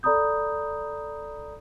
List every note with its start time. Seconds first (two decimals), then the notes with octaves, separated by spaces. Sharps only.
0.03 A4 D5 A#5 B5 D#6 G6